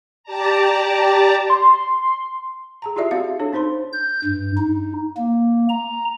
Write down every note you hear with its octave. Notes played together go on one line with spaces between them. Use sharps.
G4 D5 A5 A#5
C6
G#4 A5 A#5
E4 F4 G4 G#4 D5 E5
C4 F#4 F5
E5
D4 A4 C#5
C4 D#4 C5 B5 C6
G6
G2
D#4
A#3
A#5